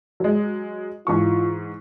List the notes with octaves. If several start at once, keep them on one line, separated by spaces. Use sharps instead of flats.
F#3 G#3
G#2 E3 F4 C#6